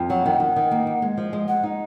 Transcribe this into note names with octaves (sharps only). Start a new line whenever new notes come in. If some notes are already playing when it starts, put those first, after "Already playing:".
Already playing: F2
F#3 F#5
D#3
D#3
D#3
A#3
A#3
G#3
F3
G#3
G#3 F#5
D#4